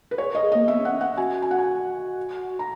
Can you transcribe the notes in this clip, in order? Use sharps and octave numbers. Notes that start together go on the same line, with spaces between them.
B4
G#4 C#5
A#4
D#5
G#4
A#3 D#5
B3 E5
C#4
F#5
C#4
F#5
F#4 G#5
G#5
F#5
G#5
A#5